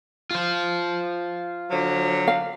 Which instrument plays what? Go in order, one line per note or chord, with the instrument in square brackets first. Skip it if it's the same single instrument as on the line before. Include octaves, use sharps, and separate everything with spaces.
[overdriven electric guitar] F4 C5
[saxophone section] D3 F3 F#3
[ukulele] F5